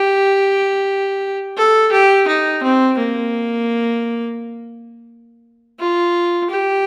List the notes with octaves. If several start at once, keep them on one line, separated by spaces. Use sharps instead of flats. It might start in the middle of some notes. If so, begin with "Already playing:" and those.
Already playing: G4
A4
G4
D#4
C4
A#3
F4
G4